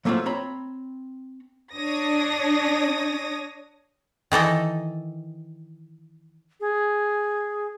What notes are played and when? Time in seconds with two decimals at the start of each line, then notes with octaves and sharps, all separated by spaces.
0.05 F#3 A3 A#3 C4 F4
0.26 C4 C#5 A#5 B5
1.76 D4 C#5 D#6 A#6
4.32 D#3 E3 A4 D#5
6.60 G#4